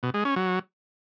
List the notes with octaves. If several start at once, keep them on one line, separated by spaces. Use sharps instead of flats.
B2
G#3
C#4
F#3